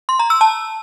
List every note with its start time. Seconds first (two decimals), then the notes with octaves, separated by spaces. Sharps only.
0.09 C6
0.19 A#5
0.30 E6
0.41 A5